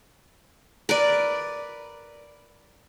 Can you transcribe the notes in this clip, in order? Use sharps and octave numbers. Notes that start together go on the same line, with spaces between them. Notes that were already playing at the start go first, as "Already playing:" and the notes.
A#4 B4 D5